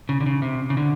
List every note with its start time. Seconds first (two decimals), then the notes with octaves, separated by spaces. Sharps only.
0.09 C#3
0.21 D3
0.26 C#3
0.42 C3
0.70 C#3
0.77 D3